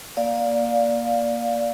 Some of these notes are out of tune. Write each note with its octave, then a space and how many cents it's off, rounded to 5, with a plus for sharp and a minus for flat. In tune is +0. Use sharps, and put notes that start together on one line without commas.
A#3 +10 D5 +0 F5 +10